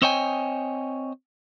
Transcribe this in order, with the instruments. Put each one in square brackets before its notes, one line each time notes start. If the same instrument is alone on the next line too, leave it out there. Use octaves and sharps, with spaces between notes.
[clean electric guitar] C4 C5 C#5 D#5 G5 G#5